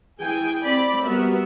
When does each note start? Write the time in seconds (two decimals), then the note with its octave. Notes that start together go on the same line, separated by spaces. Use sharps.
0.21 E3 G#4 G5 G#5
0.62 C4 D5 B5
1.04 G3 B3 F#4 A#4 E5